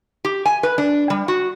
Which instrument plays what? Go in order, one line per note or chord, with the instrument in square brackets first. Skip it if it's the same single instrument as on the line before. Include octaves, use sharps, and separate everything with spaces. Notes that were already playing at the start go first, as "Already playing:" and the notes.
[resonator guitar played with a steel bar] G4
G#5
B4
D4
G3
F#4